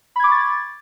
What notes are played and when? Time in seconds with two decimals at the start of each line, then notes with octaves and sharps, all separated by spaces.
0.16 B5
0.20 G#6
0.24 D6
0.28 C#6
0.32 A6